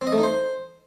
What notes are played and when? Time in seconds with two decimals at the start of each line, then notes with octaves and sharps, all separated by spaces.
0.01 C4
0.07 D#5
0.12 A3
0.18 D#4
0.23 C5